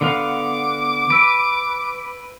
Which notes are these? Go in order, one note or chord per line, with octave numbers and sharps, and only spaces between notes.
D3 B3 F5 D6
B4 E6 D7